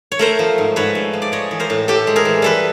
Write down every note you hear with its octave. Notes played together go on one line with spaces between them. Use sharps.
C#5
A3 A#4 C5
F3
G#2
G#2 B4 C#5
A3
F3
D5
G#3 C#5 D#5
E3
A#4 C5
A2
A2 G4 A4
G#3
G#4 A#4
E3
G3 A4 B4